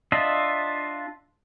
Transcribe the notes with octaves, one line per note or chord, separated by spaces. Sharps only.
D4 F4 D#5 E5